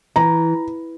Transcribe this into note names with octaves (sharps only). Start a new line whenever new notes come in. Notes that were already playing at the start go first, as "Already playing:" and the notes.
E3 A#5